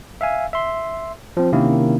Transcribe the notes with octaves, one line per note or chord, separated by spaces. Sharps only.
E5 F5 G#5
E5 C6
F3 C4
C3 D#3 A#3 C#4 E4